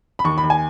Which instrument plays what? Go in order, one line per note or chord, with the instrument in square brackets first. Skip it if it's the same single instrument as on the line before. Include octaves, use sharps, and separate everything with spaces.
[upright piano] B5
D#2 C#6
B5
D#2
G#5